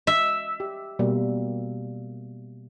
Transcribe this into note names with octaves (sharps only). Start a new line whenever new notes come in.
E5
G4
B2 G3 A#3